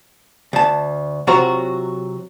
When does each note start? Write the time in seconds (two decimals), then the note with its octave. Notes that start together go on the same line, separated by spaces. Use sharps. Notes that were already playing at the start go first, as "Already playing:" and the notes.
0.53 D2 A5
1.27 C3 F#3 F4 F#4 C5 A#5